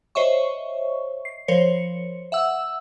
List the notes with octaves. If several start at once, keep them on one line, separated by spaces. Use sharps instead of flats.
C5 C#5 D#5 E5 C#6
C7
F3 A#4 C5 C#5 C#7
E5 F#5 E6